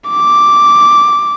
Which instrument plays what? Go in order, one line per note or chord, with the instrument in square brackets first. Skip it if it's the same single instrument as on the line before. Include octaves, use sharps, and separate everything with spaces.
[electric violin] D6